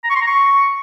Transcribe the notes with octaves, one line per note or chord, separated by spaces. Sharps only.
A#5
C#6
C6
A#5
C#6